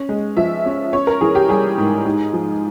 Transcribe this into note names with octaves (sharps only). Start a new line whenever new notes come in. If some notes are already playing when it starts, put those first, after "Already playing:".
Already playing: C#4
G#3
F3 E5
C#4
C#4 C#5
A#4
E3 G#4
G4
G3 G#4
G#2
G#2
F3